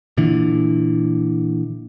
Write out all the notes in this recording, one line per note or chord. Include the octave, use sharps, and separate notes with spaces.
A#2 D3 E3